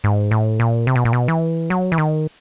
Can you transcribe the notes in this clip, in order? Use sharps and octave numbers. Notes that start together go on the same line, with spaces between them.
G#2
A2
A#2
C3
B2
A#2
B2
E3
F#3
E3
D#3